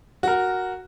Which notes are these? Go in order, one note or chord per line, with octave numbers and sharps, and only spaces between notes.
F#4 A#4